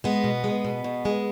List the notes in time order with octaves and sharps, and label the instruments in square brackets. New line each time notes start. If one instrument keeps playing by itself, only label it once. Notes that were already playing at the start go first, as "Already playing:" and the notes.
[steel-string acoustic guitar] G#3 B3
B2
G#3
B2
B2
G#3